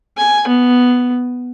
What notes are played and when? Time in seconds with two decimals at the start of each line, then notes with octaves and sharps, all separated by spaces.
0.18 G#5
0.48 B3